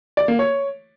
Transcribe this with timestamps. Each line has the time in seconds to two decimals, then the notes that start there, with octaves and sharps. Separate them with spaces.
0.17 D5
0.28 A#3
0.39 C#5